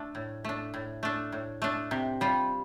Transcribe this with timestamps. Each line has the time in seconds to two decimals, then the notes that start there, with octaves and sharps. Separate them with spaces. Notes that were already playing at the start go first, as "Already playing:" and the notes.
Already playing: A3 D4
0.15 A2
0.45 A3 D4
0.74 A2
1.03 A3 D4
1.32 A2
1.62 A3 D4
1.91 C3
2.21 G3 F4